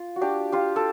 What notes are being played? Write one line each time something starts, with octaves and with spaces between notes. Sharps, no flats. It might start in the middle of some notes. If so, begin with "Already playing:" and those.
Already playing: F4
F#4
D4 G4
F4 G4
A4